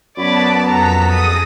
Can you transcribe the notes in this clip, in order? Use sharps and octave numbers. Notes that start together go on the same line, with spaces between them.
F#2 B3 C#5 D5 A5 B5
F2 B3 F#4 A4 A#5 B6
G#4 D#6 A#6